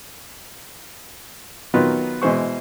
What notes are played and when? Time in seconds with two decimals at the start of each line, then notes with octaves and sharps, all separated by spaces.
1.74 D#3 F#3 B3 F4 B4
2.22 B2 E3 G#3 C5 C#6